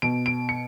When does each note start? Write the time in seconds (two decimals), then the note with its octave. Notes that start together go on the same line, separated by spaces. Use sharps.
0.02 B2 D7
0.26 D7
0.49 C#7